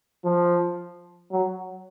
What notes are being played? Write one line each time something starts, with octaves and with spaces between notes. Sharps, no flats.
F3
F#3